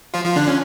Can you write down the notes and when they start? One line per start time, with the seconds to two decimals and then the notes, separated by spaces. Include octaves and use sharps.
0.14 F3 F4
0.25 F3 F4
0.36 D3 D4
0.48 C#4